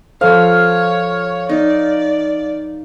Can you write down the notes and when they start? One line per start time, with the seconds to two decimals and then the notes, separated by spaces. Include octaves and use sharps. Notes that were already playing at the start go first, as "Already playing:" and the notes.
0.21 F3 A4 C5 C#5 F5
1.49 D#4 D5